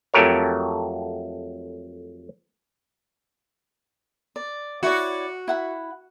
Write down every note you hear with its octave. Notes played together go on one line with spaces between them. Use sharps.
F2 F#3 A3 G4 A#4 C#5
D5
E4 F#4 C#5 D5
E4 F#5 B5